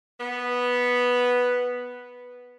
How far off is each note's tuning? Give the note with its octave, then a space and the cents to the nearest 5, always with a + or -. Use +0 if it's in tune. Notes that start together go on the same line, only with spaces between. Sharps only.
B3 -5